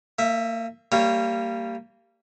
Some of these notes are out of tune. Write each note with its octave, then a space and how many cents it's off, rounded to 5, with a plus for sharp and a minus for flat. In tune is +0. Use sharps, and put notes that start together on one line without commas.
A#3 -35 E5 +0
G3 +0 A#3 -25 C#5 +0